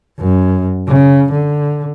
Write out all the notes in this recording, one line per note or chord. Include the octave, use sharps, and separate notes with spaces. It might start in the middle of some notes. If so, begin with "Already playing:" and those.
F#2
C#3
D3